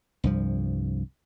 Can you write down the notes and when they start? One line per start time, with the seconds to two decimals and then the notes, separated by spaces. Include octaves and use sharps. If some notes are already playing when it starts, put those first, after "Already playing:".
0.24 C2 G2 F3